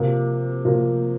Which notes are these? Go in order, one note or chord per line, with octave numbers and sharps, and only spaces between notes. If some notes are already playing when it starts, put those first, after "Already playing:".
Already playing: C3 F3 A#3
C3 F3 A#3